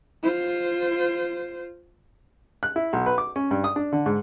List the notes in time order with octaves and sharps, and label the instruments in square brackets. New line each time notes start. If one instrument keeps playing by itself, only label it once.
[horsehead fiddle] F4 C5
[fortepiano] F#6
E4
B1
B4
D6
C#4
G2
D#6
D4
D3
G#2